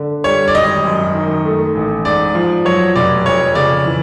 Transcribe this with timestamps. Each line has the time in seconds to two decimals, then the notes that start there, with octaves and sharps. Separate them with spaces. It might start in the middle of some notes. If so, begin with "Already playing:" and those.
Already playing: D3
0.24 G3 C#5
0.48 D5
0.55 G#1 D#5
0.85 F#2
1.15 D#3
1.45 A3
1.75 A1
2.05 G#2 D5
2.35 F3
2.65 F#3 C#5
2.96 F1 D5
3.26 F2 C#5
3.55 C#3 D5
3.86 E3